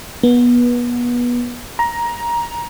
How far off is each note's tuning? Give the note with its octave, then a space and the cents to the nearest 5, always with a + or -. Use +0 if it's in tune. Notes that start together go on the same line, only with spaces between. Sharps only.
B3 -25
A#5 +15